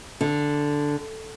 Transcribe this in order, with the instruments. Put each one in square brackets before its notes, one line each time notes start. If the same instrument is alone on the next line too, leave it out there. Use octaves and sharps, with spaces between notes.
[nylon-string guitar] D3